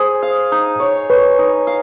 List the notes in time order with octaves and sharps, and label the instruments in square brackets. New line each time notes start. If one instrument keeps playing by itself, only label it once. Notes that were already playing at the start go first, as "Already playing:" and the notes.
Already playing: [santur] G#4 [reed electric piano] C5
[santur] F5
D#4
C#5
[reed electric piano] B4 [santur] C#5
[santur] D#4
F5